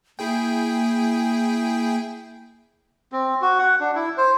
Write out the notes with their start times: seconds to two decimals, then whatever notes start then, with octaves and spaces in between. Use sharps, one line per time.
0.19 A#3 E4 G#4 G5
3.12 C4
3.42 F#4
3.59 F#5
3.80 D4
3.95 E4
4.18 C5